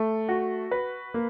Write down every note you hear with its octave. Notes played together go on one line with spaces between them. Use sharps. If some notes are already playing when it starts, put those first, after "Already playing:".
Already playing: A3
F#4
B4
A#3